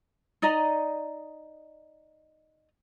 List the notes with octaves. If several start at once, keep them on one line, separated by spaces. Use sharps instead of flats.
D#4 D5 D#5 A#5